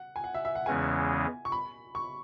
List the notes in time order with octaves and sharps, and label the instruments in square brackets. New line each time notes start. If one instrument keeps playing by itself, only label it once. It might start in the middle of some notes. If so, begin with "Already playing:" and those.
Already playing: [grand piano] F#5
G#5
F#5
E5
E5
F#5
[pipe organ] E2 C#3 E3 G#3 C#4 [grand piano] G#5
[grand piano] C#6
B5
C#6